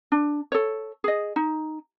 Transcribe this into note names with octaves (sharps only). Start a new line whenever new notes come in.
D4
A4 C#5
G#4 D#5
D#4